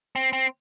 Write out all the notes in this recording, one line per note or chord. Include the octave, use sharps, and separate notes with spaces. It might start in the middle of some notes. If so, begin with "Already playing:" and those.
C4
C4